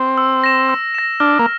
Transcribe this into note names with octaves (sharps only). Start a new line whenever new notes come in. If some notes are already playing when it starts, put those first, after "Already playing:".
Already playing: C4
E6
A#6 E7
E6
A#6 E7
D4 F6
A#3